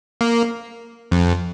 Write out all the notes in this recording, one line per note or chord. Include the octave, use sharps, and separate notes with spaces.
A#3
F2